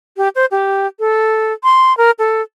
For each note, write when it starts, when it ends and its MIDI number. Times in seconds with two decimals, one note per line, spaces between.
0.17 0.28 67
0.35 0.45 72
0.51 0.87 67
0.99 1.53 69
1.63 1.96 84
1.98 2.11 70
2.19 2.42 69